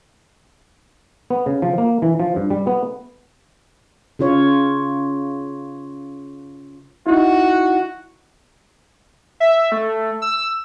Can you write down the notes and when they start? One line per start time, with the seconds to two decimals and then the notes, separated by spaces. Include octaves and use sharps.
1.30 B3
1.46 C#3
1.62 F3
1.78 A#3
2.02 E3
2.20 F3
2.36 G2
2.50 G3
2.67 B3
4.19 C#3 F4 C#5
7.07 D#4 E4 F#4
9.40 E5
9.72 A3
10.22 E6